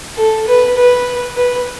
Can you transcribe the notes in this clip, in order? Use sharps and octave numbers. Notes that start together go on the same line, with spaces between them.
A4
B4
B4
B4